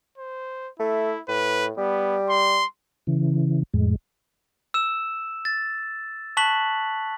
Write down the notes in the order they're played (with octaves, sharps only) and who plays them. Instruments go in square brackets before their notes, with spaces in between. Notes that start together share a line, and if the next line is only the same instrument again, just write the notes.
[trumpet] C5
[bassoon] A3 [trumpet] E4
[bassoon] A2 [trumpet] B4
[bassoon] G3 [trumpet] B3
[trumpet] C6
[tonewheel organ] C#3 E3
F2 A2 G#3
[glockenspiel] E6 E7
A6
A5 C#6 F#6 B6 F#7